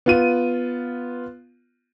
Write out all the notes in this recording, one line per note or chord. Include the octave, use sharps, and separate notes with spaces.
B3 F4 D#7